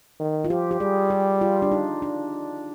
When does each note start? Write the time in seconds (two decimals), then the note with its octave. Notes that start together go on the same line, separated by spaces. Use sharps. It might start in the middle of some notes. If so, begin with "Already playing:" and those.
0.20 D#3
0.44 F4
0.50 F3 G4
0.71 G4
0.80 G3 G#4
1.10 G4
1.41 F4
1.62 D4
1.72 D#4
2.02 D4